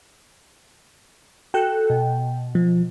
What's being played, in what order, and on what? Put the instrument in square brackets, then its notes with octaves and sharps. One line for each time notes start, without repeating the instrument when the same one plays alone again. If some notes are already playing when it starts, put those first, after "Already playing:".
[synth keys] F#4 A4 F#6 [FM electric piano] G5
[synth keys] B2
[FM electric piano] F3